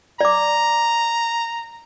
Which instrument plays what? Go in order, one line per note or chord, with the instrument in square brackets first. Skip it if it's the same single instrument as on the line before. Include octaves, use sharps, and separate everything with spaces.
[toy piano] D5 D6 [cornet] A#5